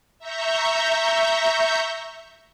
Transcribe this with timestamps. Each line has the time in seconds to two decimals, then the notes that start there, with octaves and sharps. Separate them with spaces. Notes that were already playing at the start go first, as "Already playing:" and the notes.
0.19 E5 A#5 C#6 G6